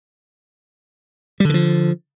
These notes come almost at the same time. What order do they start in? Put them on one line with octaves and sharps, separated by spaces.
G3 D3 D#3 F3